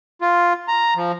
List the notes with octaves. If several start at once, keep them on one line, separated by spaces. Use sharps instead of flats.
F4
A#5
F3